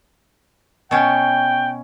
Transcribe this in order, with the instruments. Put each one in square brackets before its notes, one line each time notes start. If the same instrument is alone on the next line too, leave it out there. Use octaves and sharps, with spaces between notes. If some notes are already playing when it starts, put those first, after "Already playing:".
[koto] B2 C#4 [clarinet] G5